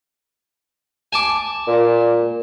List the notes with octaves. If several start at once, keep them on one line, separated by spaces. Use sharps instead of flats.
G#5 A5 D6
A#2